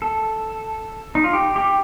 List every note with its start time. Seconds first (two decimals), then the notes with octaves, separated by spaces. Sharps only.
0.02 A4
1.15 D#4
1.24 F4
1.33 G4
1.56 G4